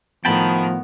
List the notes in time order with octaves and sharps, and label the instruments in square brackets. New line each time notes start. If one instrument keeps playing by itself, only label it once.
[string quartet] A2 D#3 A#4 [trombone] F3 [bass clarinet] B3 [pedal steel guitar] G5 A5 B5